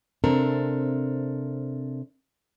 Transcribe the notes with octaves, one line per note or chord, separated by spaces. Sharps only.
C3 C4 D4 A4 A#4